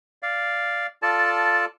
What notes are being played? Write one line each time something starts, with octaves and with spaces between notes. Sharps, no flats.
D5 F5
F4 A4 D5 A5